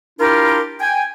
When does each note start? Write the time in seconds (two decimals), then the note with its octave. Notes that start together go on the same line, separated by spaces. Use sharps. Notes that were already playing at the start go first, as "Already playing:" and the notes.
0.20 D4 E4 F4 G4 A#4
0.80 G5 G#5